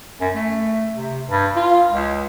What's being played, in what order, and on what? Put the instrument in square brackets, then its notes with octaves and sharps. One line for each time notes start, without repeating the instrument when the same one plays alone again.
[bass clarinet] F#2
A3
C3
G2
F4
C#2